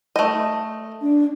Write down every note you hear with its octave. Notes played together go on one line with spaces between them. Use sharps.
A3 D#5
D4